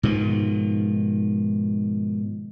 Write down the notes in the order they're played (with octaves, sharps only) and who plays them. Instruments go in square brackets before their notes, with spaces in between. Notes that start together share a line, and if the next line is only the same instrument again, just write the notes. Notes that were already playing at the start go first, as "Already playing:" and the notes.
[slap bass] G#2 B2 D#3 F3